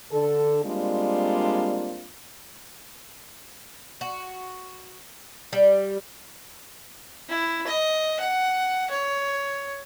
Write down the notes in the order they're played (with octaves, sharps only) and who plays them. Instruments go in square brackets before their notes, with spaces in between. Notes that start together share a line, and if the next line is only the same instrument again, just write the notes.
[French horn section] D3 A4
G3 G#3 A#3 C4 D4 F4
[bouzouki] F#4
G3
[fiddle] E4
D#5
F#5
C#5